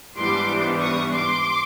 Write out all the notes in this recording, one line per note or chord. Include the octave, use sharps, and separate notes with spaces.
G#2 E3 G3 B3 D4 C6 D6
C#6 D#6
C6 D6